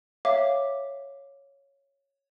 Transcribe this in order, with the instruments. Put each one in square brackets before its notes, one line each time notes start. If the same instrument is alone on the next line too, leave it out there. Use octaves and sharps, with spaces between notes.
[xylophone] C#5 E5 F5 D6